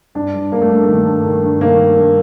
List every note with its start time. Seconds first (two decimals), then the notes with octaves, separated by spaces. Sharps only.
0.15 G2 D4
0.34 G2
0.52 G2 A#3
0.62 A3
0.70 G2
0.84 D#3 A3
1.06 G2
1.25 D#3
1.42 G2
1.61 D#3 A#3
1.79 D#3
1.97 G2